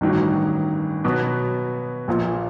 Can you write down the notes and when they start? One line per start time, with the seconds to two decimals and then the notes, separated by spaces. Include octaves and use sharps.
0.01 A1 G2 D#3 F#3
1.04 B2 F#3 B3
2.08 A#1 A#2 F3